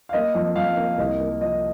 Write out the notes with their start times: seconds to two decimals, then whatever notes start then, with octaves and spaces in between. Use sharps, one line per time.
0.09 F5
0.13 A#3 D#5
0.35 F2
0.55 F2 F5
0.77 A#3
0.98 C2 D#5
1.20 A#3
1.41 F3 D#5